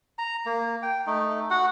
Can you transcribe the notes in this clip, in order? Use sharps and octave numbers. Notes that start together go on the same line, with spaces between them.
A#5
A#3
G5
A3 D#4
F#4 F#5